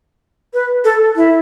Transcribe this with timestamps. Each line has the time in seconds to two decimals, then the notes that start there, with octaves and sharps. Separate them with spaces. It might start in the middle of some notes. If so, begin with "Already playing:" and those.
0.54 B4
0.84 A4
1.16 E4